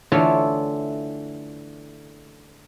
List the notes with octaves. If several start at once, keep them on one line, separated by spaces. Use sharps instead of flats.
D3 E3 A3 F4 C#5